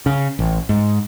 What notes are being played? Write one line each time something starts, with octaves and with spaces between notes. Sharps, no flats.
C#3
A1
G#2